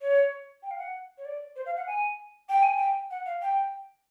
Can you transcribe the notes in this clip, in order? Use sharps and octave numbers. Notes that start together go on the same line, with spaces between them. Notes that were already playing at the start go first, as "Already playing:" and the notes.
C#5
G5
F5
F#5
C#5
D5
C5
F5
F#5
G#5
G5
G#5
G5
F#5
F5
G5